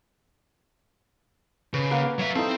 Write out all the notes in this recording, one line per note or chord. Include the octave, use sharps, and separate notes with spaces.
C#3 B4
A#3 F5 F#5
F#3 E5
C4 D#4 E4 A4